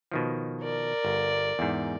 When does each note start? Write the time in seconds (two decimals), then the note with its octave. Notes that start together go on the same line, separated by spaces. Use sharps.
0.11 B2 D#3 F3
0.62 A#4 D5
1.05 G1
1.59 E2 G#2